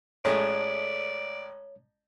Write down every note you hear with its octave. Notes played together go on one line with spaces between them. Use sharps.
A1 G#3 A3 C#5 D5